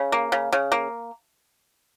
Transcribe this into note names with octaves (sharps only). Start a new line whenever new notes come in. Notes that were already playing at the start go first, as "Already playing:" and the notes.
Already playing: C#3
A#3
C#3
C#3
A#3